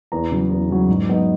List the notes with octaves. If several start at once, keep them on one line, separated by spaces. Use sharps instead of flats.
E2 A#5
C#3 F#3
E2
C#3 F#3
G#2
F#3 B3 D#4